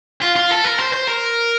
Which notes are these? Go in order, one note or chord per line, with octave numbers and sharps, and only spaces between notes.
F4
F4
A4
A#4
C5
C5
A#4